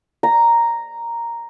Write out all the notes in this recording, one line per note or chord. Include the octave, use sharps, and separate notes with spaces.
A#5